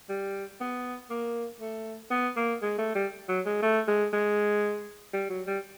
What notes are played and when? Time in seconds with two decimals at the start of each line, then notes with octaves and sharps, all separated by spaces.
0.09 G3
0.60 B3
1.10 A#3
1.61 A3
2.11 B3
2.37 A#3
2.62 G#3
2.78 A3
2.95 G3
3.29 F#3
3.46 G#3
3.63 A3
3.88 G#3
4.13 G#3
5.13 G3
5.30 F#3
5.47 G3